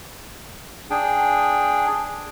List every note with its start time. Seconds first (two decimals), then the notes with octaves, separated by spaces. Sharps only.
0.90 D4 G#4 G5